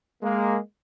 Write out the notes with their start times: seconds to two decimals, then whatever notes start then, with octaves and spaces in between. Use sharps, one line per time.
0.23 G#3 A#3